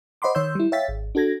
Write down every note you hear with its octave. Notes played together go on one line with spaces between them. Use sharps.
C5 D#5 F#5 B5 C6 D6
D#3 C#5 C6 E6 G6
G3 E4
C#5 E5 F5 G5 A6 B6
G#1
D4 F#4 A4 G#6 A#6